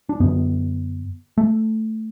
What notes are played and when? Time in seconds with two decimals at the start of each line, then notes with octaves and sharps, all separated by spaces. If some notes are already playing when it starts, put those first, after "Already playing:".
0.09 D4
0.20 F#2 D3 B3
1.38 A3